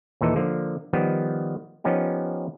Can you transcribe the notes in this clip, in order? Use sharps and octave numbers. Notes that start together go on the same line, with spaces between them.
D#2 A#2 E3 D#4 A4
D3 F3 A#3
D#3 F3 G3 B3
F3 B3 C#4 D#4 G4